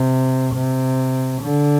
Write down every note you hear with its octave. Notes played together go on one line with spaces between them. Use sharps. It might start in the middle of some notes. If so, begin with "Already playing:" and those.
Already playing: C3
C3
D3